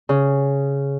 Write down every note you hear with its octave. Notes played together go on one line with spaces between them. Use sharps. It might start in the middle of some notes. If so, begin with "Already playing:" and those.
C#3